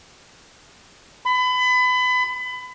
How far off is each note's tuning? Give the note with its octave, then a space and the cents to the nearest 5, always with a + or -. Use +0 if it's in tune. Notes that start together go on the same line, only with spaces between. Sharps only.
B5 +30